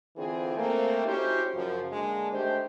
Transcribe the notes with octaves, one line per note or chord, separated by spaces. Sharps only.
D3 E3 C4 F4 G#4
A3 A#3 C4
C#4 D#4 E4 F#4 G4 C5
F#2 C#3 F3
D3 G#3 A#3 D4
D#3 A3 D4 G4 C5